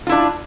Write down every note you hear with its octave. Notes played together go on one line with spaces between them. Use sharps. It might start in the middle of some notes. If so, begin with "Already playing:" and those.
D4 E4 F4